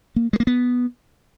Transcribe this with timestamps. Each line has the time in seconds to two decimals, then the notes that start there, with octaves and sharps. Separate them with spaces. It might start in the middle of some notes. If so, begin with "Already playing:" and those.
0.16 A#3
0.33 G#3
0.40 A#3
0.47 B3